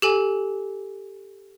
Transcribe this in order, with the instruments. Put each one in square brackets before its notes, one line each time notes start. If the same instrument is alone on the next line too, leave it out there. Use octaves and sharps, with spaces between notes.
[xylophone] G4 A4 G#5